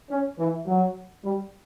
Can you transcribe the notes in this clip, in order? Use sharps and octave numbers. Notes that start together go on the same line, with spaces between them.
C#4
E3
F#3
G3